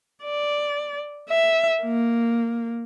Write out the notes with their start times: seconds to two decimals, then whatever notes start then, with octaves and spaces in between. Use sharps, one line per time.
0.24 D5
1.30 E5
1.82 A#3